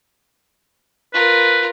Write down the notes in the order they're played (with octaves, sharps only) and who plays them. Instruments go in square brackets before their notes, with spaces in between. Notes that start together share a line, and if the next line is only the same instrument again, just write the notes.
[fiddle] F4 A#4 [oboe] B4